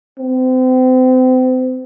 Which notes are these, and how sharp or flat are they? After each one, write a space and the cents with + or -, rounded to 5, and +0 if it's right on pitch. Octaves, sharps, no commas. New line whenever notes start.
C4 -35